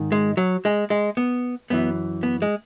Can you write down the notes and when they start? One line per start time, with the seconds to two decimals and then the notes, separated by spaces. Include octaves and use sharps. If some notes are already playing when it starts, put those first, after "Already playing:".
Already playing: G#2 D#3
0.12 G#3
0.37 F#3
0.65 G#3
0.90 G#3
1.17 B3
1.70 F#2 E3 B3
2.23 B3
2.42 G#3